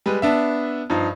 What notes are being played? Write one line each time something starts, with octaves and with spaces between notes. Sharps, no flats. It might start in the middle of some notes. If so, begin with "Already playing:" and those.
G3 G#3 B4
B3 D4 E5
G2 F3 D#4